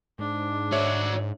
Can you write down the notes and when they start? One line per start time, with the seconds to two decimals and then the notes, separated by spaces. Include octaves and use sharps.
0.19 G#2 D4
0.72 F#4 C#5 D5 E5